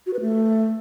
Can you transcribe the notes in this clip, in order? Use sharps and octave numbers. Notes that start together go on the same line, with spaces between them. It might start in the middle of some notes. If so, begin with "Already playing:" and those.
F#4
B4
A3